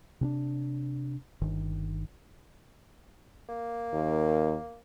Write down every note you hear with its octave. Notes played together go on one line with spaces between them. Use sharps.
C3 C#4 D4
G1 D#3
A#3
D#2